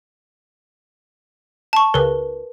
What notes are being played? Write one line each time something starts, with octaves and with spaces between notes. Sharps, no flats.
A5 C#6
C#2 A#4 B4